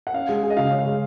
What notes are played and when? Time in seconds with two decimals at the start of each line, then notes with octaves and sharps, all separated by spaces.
0.07 F#5
0.14 C#4 F5
0.29 G#3
0.43 G#4
0.50 D#5
0.57 C#3 F5
0.71 C#4
0.79 F5
0.85 G#3